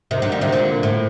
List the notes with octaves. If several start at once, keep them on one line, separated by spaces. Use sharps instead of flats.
C3 D#3
D3 F#3
G3 A#3
C3 D#3
A#2 D3
A2